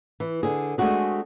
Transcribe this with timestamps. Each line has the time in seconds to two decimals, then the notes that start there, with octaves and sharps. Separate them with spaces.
0.20 E3
0.43 D3 G#4
0.78 G#3 A3 C4 D4 F#4 G#4